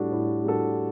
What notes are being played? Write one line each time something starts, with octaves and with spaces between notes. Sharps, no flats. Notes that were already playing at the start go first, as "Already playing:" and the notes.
Already playing: A2 G3 D4 F#4 A4
A2
G3 D4 F#4 A4